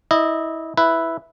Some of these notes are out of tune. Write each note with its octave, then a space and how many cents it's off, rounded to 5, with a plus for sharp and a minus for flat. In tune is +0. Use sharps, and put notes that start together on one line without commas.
E4 -25 D#5 -15
E4 +0 B4 +0